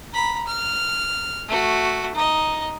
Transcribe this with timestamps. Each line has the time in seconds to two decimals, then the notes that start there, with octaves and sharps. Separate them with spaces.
0.13 A#5 B5
0.47 F6
1.48 A3 F#4
2.15 D#4 D#5